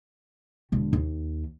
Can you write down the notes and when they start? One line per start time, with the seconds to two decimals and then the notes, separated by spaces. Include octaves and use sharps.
0.72 E1 D3
0.93 D#2